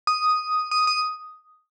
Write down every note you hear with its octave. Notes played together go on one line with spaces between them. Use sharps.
D#6
D#6
D#6